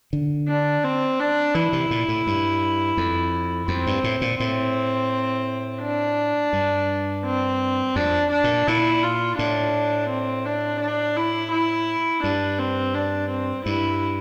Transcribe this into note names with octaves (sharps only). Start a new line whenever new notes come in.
D3
D4
C4
D4
E3 E4
C3
A#2
A2
G2
F2
F2 C4
G2
A2
A#2
A2 C4
D4
G2
C4
F2 D4
D4
A#2
A#2 E4
F4
A2 D4
C4
D4
D4
E4
E4
G2 D4
C4
D4
C4
G2 E4